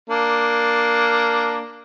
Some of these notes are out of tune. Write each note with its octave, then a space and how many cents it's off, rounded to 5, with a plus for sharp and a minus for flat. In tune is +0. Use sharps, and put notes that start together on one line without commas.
A#3 +0 D4 +0